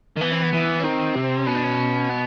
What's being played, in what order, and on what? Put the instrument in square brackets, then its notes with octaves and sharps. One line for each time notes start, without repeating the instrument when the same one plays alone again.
[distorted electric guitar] D#3
[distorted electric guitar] E3 [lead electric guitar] B3
[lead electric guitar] C4
B3
[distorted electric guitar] E3
[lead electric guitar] C#4
[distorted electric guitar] D#3 [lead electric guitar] C4
[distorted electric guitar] C3
[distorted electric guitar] B2 [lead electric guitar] C#4
[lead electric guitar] D4
C#4
B3